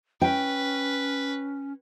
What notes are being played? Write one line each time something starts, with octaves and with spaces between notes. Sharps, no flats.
C#4 B4 G5